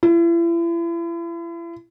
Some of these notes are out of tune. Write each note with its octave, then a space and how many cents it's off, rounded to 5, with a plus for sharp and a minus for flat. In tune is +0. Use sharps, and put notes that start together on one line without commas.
E4 +40